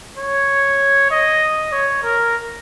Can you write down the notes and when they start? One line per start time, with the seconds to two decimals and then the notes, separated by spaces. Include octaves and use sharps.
0.18 C#5
1.11 D#5
1.72 C#5
2.03 A#4